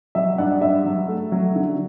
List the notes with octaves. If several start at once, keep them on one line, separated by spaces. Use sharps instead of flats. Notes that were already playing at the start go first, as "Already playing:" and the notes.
F#3 E5
G2 D5 F#5
G2 E5
F#3
A3
F#3
D3